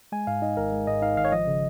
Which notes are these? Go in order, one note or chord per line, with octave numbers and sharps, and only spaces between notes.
G#3 G#5
G#2 F5
D#4 D#5
G#1 A#4
G#3
G#2 D#5
D#4 F5
G#1 F5
C#5
F3 D#5
C#3